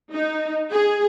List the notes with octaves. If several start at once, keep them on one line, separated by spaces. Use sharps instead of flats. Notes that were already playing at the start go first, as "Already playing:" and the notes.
D#4
G#4